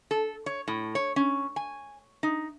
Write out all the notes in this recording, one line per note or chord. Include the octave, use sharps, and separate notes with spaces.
A4
C#5
A2
C#5
C#4
G#5
D#4